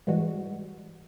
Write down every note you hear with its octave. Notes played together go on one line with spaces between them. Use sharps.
G#2 E3 G3 G#3 F#4